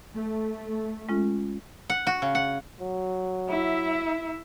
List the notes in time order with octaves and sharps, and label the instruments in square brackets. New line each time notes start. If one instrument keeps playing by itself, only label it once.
[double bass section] A3
[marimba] G#3 C#4 F4
[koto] F#5
F#4
C#3
F#5
[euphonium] F#3
[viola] E4 E5